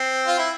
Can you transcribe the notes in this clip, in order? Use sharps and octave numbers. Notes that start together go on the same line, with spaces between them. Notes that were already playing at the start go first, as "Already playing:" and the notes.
Already playing: C4
F4
E4